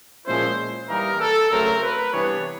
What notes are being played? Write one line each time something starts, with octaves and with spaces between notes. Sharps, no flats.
A#2 F3 G#3 C#4 E4 C5
E3 G3 A#3 D#4 A#4
A4
C#3 F#3 A3 C4 A#4
B4
C3 E3 G3 B3 D4 C#5